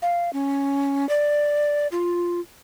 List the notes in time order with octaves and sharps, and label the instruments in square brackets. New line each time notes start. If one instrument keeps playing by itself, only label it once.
[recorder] F5
C#4
D5
F4